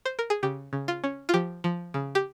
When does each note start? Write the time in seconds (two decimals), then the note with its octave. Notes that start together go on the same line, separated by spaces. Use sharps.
0.06 C5
0.19 A#4
0.30 G#4
0.43 C#3 G4
0.73 C#3
0.88 F4
1.04 C#4
1.29 F4
1.34 F3 G4
1.64 F3
1.94 C#3
2.15 G4